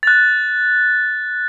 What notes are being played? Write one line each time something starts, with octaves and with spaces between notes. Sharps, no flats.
F#6 A6